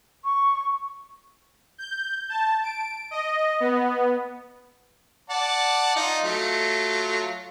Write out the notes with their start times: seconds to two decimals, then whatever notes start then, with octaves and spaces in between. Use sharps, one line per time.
0.25 C#6
1.78 G6
2.29 A5
2.63 D7
3.11 D#5
3.60 B3
5.30 D5 F#5 A5
5.96 D#4 F4
6.24 F#3 A3 F4